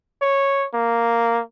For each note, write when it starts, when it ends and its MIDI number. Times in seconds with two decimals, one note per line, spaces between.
0.22 0.66 73
0.74 1.41 58